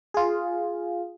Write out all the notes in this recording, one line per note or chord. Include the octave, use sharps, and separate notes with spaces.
F4 G#4